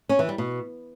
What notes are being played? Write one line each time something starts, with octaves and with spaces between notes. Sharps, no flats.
C#4
E3
G3
B2